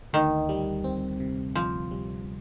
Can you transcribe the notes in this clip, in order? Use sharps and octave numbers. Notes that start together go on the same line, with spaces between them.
D2 D#3
G3
C4
C3
D2 F3
G3